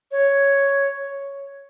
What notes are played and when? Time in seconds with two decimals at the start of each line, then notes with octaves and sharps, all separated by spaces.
0.12 C#5